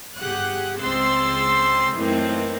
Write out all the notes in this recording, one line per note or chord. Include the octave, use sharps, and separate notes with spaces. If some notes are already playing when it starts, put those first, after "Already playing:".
G1 G4 G#4 F#5 F#6
C#2 G#3 C4 C6 E6 A6
F#2 A2 D#3 E3 A#3 C4